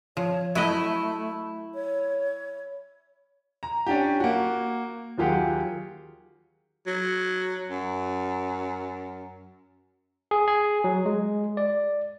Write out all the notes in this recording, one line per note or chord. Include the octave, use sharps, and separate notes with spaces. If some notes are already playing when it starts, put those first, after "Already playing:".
F3 C#5
F#3 A3 E4 B4 D#5
C#5
A#5
C#4 D4 G4
A#3 F#4
D#2 F#3 F4 G4 G#4 F#5
F#3
F#2
G#4
G#4
F#3
G#3
D5